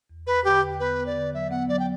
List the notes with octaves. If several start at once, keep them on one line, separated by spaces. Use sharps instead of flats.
E2
E2 B4
D3 G4
E2
B3 B4
B3
D5
D3
F#3 E5
B3 F#5
F#3 D5
G5